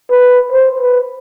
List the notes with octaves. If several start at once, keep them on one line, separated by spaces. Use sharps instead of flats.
B4
C5
B4